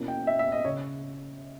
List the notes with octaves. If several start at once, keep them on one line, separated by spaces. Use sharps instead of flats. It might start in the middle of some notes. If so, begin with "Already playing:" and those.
Already playing: B2 A#3 C#4 E4
G5
E5
E5
D#5
C#3 C#5